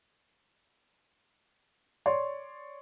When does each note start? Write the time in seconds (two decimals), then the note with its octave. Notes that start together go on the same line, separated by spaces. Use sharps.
2.06 C#5 D5 C6